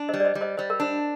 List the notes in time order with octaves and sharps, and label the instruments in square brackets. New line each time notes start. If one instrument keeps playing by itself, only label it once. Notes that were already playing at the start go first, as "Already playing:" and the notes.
Already playing: [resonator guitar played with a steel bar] D4
[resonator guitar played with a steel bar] G3 [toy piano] C5 D#5
[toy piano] D5
C5 D#5
[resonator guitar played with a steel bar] G3
[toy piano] C5 D#5
[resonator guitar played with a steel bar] G3 [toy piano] C5
[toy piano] A#4
[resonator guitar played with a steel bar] D4 [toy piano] C5